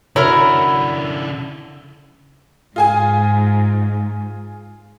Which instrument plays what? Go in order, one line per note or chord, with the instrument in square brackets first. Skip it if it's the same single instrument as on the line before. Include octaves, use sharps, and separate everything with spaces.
[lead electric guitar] C#3 D4 [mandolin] E4 F#4 F6 [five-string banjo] A#4 C#5
[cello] G#2 [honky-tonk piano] F4 G#4 G#5